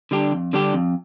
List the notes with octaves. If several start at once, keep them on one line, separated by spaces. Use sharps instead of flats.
D3 G3 D4 G4
F2
D3 G3 D4 G4
F2